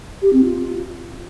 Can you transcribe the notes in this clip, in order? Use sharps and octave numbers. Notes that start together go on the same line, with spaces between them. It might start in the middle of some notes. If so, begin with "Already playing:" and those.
G4
C4
F4